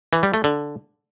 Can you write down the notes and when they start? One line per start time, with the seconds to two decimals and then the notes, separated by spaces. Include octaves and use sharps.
0.13 E3
0.23 G3
0.34 A3
0.44 D3